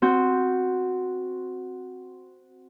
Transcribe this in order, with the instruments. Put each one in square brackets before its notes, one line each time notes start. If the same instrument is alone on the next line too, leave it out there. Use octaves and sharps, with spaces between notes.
[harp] C4 F#4 G6